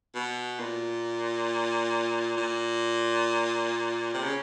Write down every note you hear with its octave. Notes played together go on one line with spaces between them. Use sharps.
B2
A#2
A#2
C3
C#3